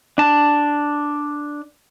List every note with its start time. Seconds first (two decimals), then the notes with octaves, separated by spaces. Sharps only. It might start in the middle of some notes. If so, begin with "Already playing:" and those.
0.18 D4 A5